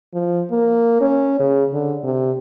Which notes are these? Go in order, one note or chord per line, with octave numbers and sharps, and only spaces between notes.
F3
A#3
C#4
C#3
D3
C3